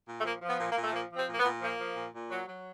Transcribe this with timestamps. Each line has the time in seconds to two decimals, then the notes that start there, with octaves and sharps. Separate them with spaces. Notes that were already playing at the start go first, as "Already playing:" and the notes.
0.08 A#2
0.21 A3
0.25 F3 A#3
0.42 F3
0.48 B3
0.60 A#2
0.71 A#3
0.77 A#2
0.84 A3
0.93 F3 A#3
1.11 F3
1.16 C4
1.28 A#2 A#3
1.40 B3
1.45 A#2
1.62 F3 A#3
1.79 F3
1.96 A#2
2.13 A#2
2.31 F#3
2.48 F#3